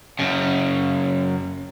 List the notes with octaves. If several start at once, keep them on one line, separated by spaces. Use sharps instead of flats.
F#2 C#3